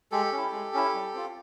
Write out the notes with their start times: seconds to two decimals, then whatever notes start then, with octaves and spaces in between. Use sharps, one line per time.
0.12 G#3 G4 A4
0.32 C#4
0.37 E4
0.52 G#3
0.74 C#4 E4
0.94 G3
1.14 C4 F4